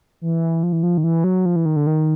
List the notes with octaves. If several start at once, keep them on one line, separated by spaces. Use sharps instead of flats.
E3
F3
E3
F3
D#3
E3
F#3
F3
E3
D#3
D3
D#3